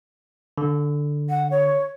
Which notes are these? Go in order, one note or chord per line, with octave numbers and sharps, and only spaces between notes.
D3
F#5
C#5